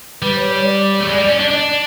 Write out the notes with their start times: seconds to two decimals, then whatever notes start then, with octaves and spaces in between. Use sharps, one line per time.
0.22 G3 B4
0.37 C#5
0.50 C#5
0.64 D5
1.00 A3
1.08 G#3
1.19 G3
1.29 C#4
1.40 D4
1.50 D4 D#5